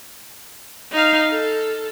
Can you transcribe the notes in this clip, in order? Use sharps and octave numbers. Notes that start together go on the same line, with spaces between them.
D#4 F5
A4